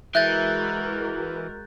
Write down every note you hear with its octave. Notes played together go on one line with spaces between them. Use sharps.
E3 G#3 F#4 A#4 E5 F#6 G6 A6